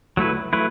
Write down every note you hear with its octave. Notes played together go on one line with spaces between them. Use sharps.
F#3 A3 E4 B4
F#3 A3 E4 B4